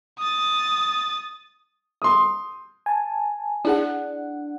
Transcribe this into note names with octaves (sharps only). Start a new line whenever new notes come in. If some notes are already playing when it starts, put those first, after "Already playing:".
D#6 A6
C6 D#6
G#5 A5
D4 E4 G#4 F#5